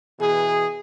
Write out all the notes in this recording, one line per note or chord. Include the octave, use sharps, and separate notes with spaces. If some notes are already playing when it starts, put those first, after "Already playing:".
B2 E3 G#4